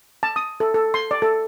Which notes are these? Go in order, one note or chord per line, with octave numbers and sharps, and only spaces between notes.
A5
D#6
A4
A4
C6
D5
A4